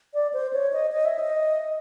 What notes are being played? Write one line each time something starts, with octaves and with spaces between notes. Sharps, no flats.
D5
C5
C#5
D#5
D#5
E5
D#5